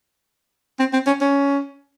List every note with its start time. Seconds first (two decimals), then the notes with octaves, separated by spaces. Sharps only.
0.79 C4
0.93 C4
1.07 C#4
1.21 C#4